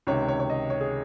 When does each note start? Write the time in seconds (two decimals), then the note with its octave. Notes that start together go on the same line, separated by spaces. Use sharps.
0.07 C#2 C3 D#3 C#5
0.28 C#5
0.40 C#5
0.50 D#5
0.70 C#5
0.81 G#4